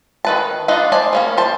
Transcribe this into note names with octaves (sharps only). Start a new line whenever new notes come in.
D#3 B4 A5
D4 D#4 F4 B4 D#5
C5 D5 G#5 A5
D#3 A#3 C#4
C5 A5